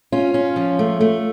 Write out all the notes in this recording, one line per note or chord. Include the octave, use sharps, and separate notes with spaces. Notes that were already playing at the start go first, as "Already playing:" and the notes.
C#4 F4
C#4
F3
A3
A3